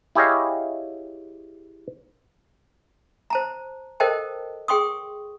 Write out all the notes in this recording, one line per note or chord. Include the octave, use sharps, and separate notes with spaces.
E4 G4 G#4 C#5 D#5 F5
C5 A5 A#5
A4 A#4 C5 D#5 G5 A5
G#4 G5 C6 C#6 D#6